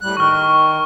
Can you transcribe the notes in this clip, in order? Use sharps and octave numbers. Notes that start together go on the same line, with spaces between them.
A2 G3 F#6
D#3 C#6 F6